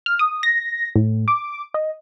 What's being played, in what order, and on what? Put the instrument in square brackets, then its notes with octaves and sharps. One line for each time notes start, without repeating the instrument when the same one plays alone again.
[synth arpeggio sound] F6
D#6
A#6
A2
D6
D#5